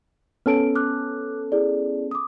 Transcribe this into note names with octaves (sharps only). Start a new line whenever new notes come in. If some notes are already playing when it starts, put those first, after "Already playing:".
B3 C#4 A4 F6 D7
D6 F6 F#6
E4 G#4 D5
D6 D#6